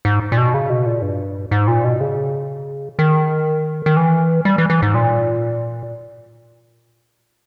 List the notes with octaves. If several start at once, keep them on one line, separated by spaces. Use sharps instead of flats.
G#2
A#2
B2
C#3
B2
A#2
G2
G#2
A#2
B2
C#3
D#3
D#3
E3
G3
E3
E3
G#2
A#2